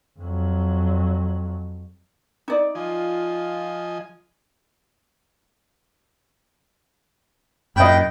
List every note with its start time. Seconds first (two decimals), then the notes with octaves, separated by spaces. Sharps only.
0.20 F2 F#3
2.48 D#4 D5
2.75 F3 F4 D#5 G#5
7.76 F#2 A#2 D#5 G5 B5